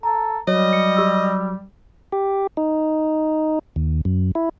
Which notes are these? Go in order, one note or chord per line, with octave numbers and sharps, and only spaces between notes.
A4 A#5
F#3 G3 C#5 D#5
C#7
G4 E6
G4
D#4
D#2
F#2
E4